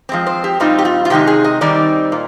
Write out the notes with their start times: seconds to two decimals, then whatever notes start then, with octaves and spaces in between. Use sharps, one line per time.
0.09 F3 G#3 C4
0.26 C5
0.44 G4
0.60 A#2 G3 C4 D#4 F4
0.78 G4
0.85 F4
1.05 F4
1.10 C3 D#3 G#3 D#4 G4
1.27 G#4
1.44 D#5
1.61 D#3 G3 C4 D#4 D5
2.12 A#2